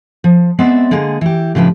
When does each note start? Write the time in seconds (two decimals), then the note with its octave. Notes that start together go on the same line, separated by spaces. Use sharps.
0.24 F3
0.59 G#3 B3 C4 C5 D5 E5
0.91 D3 G#3 A#3 G#4
1.21 E3 G4
1.55 A2 C#3 F3 D4 B4